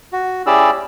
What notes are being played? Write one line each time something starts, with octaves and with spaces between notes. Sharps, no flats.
F#4
C#4 E4 G4 G#4 D5 E6